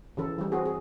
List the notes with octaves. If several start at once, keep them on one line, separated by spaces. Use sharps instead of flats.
C#3 E3 A4
E3 G3
C4 F#4 G#4
G#4